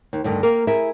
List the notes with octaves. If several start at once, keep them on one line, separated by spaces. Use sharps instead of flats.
D#2
D2 G2 D3 D#3
A#3 A#4 E5 G5
E4 G#4 A#4 E5